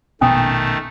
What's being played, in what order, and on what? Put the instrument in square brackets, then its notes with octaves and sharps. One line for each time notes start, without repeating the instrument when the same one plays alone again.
[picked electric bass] F1 A#1 B2 [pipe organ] D#3 A3 [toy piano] C#4 G#5 D#6